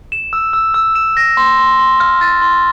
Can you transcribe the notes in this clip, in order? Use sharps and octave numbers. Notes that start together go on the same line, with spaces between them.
E7
E6
E6
E6
E7
A#6
C6
C6
C6
F6
A6
C6